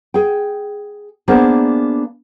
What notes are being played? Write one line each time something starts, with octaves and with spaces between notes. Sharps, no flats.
G#4 G5
A#3 B3 D4 G#4 A#4 C5